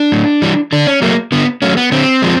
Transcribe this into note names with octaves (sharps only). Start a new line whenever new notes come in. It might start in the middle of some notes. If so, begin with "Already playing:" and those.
Already playing: D4
A2
E3 G3
D3 D4
C#4
F#3 A3 A#3
D3 B3
F#3 A3 C#4
B3
D3 C4
F3 G#3